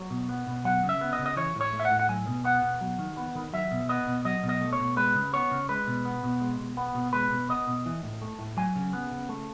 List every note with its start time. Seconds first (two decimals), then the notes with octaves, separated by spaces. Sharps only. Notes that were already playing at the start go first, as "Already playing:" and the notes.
Already playing: F#3
0.10 B2
0.29 B3
0.47 B2
0.65 F#3 F#5
0.83 C#3
0.89 E5
1.01 B3
1.13 D#5
1.19 C#3
1.26 D#5
1.36 E3 C#5
1.55 A2
1.61 C#5
1.73 A3
1.80 E5
1.85 F#5
1.91 A2
2.00 F#5
2.09 F#3 G#5
2.27 B2
2.44 B3 F#5
2.62 B2
2.81 F#3
2.99 D#3
3.17 B3
3.35 D#3
3.53 F#3 E5
3.71 B2
3.89 B3 D#5
4.07 B2
4.25 F#3 D#5
4.43 B2
4.49 D#5
4.61 A3
4.73 C#5
4.79 B2
4.97 G#3 B4
5.15 C#3
5.33 B3 C#5
5.51 C#3
5.69 G#3 B4
5.87 B2
6.05 B3
6.23 B2
6.41 G#3
6.59 B2
6.77 B3
6.95 B2
7.13 G#3 B4
7.31 B2
7.49 B3 D#5
7.67 B2
7.86 E3
8.03 A2
8.22 A3
8.39 A2
8.57 F#3 G#5
8.75 C#3
8.93 B3
9.11 C#3
9.29 A3